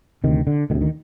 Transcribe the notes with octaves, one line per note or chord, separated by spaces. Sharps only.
D2 C3 D#3
D3
D2 C3 D#3
D#3